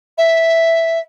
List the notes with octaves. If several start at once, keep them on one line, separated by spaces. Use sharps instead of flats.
E5